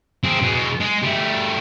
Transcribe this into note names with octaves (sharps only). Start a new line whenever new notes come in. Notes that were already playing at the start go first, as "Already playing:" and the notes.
C4 G#4
B2 G#3
G#3
G3 A3